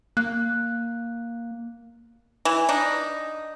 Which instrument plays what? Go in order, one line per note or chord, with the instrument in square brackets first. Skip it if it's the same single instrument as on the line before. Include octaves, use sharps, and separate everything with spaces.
[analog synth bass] A#3 [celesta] F#6
[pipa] E3
D4 D#4